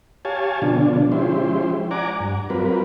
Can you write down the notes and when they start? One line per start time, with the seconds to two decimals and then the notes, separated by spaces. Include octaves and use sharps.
0.25 G4 C#5 F5 G#5 A5
0.62 B2 D3 F3 D4
1.12 F3 G#3 C#4 E4 G4 C5
1.91 D5 F#5 G#5 A#5 D6
2.20 G2
2.50 F#3 G3 C4 F4 A#4 B4